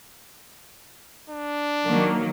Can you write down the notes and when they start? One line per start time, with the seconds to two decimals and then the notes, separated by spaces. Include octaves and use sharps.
1.30 D4
1.88 D#3 F#3 A#3